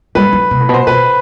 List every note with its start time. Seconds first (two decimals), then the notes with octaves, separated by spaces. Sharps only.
0.15 G3 B4
0.33 F#3
0.51 C3
0.60 A2
0.69 B2
0.74 C5
0.87 B2 B4